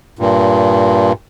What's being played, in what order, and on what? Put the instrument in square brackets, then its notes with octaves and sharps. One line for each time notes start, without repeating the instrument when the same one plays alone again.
[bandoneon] G2 A#2